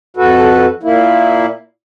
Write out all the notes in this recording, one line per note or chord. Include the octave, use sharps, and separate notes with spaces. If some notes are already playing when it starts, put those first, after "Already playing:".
F2 F#4 A4 B4
A#2 A#3 E4